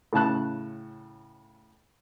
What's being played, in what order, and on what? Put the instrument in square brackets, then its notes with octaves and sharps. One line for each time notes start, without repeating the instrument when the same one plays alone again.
[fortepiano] A2 C#3 A5 F#6